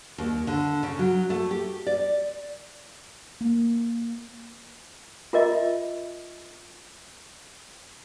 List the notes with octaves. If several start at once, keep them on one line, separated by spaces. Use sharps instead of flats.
D#2
D3
C#3
F#3
A3
G4
D5
A#3
F4 A#4 D#5 E5